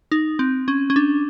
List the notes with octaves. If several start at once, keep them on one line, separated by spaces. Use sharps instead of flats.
D#4
C4
C#4
C#4
D4